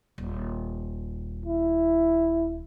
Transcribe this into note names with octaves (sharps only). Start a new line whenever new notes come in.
D#1
E4